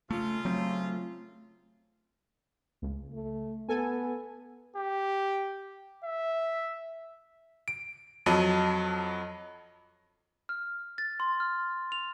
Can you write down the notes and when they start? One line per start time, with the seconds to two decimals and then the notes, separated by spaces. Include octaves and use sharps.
0.11 C#3 A3 F4
0.45 F#3 A3 C4
2.82 C#2
3.13 A3
3.69 B3 A4 G#5
4.76 G4
6.05 E5
7.68 D7
8.26 F2 F#3 D#5 A5 D#7
10.49 F6
10.98 A6
11.20 C6
11.40 F6
11.92 F7